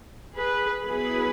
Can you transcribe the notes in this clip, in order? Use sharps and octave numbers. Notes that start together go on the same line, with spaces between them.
G#4 B4
F#3 B3 E4 G#4 B4